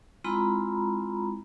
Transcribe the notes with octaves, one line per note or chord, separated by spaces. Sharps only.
G#3 C4 E4 F4 A#5 B5